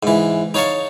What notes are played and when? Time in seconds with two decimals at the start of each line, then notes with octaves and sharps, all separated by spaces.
0.03 G#2 E3
0.54 D#4 C#5 F5 A5 C#6